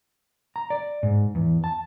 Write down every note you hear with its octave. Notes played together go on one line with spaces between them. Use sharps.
A#5
D5
G#2
E2
A5